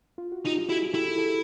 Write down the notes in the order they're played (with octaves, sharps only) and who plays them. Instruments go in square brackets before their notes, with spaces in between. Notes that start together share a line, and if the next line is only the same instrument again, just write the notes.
[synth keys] F4
F#4
[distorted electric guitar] D#4 [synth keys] F4 G4
[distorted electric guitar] E4 [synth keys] F#4 G#4
[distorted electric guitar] E4 [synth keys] G4 A4
[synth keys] G4 A4